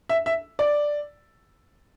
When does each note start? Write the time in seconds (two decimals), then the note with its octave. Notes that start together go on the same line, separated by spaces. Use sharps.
0.09 E5
0.26 E5
0.59 D5